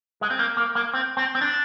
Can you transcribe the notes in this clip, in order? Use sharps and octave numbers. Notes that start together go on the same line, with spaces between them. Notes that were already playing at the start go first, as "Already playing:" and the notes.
G#3
C4
A#3
A#3
A#3
C4
C4
C4
D4